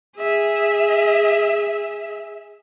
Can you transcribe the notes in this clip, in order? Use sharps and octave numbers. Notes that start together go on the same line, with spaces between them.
G#4 E5